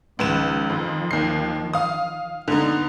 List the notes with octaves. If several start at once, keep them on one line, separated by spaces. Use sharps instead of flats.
C#2 D#3 F3 B4 E7
F2
D#2 C7
F5 D#6
D3 B3 D#4